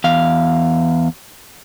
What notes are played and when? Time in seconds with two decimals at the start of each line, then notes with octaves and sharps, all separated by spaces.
0.04 E2 F5